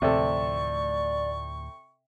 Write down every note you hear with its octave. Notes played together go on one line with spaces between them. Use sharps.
D2 A2 C3 F3 A4 D5 C#6